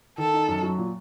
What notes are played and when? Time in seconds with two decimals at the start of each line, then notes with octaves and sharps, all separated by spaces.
0.18 D#3 A4
0.34 D#4
0.48 F#2
0.63 F#3
0.78 A#2